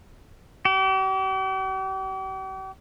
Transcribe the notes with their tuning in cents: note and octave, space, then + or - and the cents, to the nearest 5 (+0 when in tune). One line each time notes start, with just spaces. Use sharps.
G4 -45